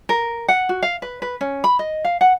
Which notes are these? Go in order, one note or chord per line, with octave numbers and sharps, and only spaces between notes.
A#4
F#5
F#4
F5
B4
B4
C#4
B5
D#5
F5
F#5